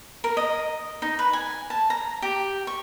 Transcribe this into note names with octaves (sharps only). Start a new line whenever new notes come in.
A#4
D#5
D#4
B4
G#5
A5
A#5
G4
C#6